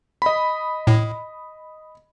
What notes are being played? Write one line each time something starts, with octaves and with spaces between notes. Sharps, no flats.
D#5 B5
A2